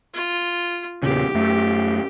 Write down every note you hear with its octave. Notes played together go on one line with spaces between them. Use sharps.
F4
E2 A#2 C#3 G4
F#2 A3